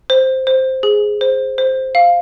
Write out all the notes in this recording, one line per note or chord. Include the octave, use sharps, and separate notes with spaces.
C5
C5
G#4
C5
C5
F5